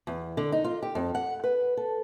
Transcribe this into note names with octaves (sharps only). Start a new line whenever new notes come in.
E2
D3
D#4
F4
G4
F2
F#5
B4
A4